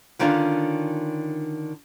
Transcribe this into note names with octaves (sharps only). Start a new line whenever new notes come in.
D3 D#3 C#4 D4 F4